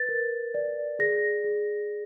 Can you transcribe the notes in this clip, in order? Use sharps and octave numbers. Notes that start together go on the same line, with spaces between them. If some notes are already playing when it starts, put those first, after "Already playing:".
Already playing: B4 A6
A#4
D5
G#4 A#6
G#4